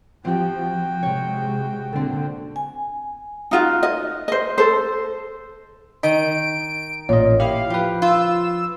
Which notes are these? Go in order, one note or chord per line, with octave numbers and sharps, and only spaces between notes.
F3 C4 F#4 G4 G5
C3 G#3 C#5
A#2 D3 C4 A4
G#5
D#4 F4 F#4
D#5
C5 D#5
A4 C5
D#3 D#5 D7
A1 A#2 C#5 D#5
E4 G4 F5
F3 G4 B4
F4 E6